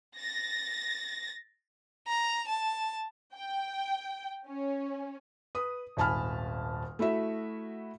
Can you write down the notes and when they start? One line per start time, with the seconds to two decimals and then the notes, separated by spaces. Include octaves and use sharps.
0.17 A6 A#6
2.08 A#5
2.48 A5
3.35 G5
4.47 C#4
5.55 B4 D#6
5.97 D#1 G#1 G#5 A5 B5 F6
6.99 A3 E4 F#4 E5